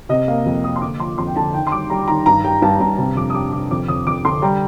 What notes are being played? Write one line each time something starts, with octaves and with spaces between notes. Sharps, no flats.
C3 D#5
A#3 F5
F2
A#3 D#6
C6
D3 D6
F3 C6
F2 C6
G5
D3 A5
D#3 G5
C6
G3 D6
G3 A#5
D#3 A#5
G2 A#5
G3 G5
G2 A5
G2 A#5
C3 A#5
F2 D6
D#6
G3 D6
C3 D6
F2 D6
F2 D#6
F2 D6
D3 C6
G3 A#5